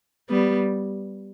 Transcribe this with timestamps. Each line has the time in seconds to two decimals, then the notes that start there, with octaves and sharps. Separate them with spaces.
0.30 G3 B3